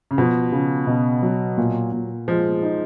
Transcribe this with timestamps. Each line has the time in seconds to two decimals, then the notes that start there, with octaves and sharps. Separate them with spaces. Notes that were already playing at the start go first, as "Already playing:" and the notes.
0.11 C#3
0.18 B2 F3
0.52 C#3
0.87 B2
1.22 F#3
1.58 A#2
1.92 A#2
2.28 F3 G#3
2.63 D#4